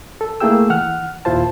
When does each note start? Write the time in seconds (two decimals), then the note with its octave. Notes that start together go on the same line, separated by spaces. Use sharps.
0.21 A4
0.40 A3 A#3 E4 G#4 G5 E6
0.70 E3 F#5 F6
1.25 D#2 A#2 E4 F4 C5 A5